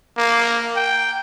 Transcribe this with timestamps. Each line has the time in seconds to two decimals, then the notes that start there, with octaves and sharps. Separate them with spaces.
0.18 A#3
0.76 G5